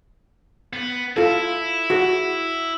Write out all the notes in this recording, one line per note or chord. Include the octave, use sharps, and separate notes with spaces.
B3
E4 F4 A4
F#4 G#4